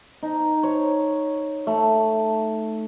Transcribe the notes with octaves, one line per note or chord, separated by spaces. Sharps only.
D#4
C#5
A3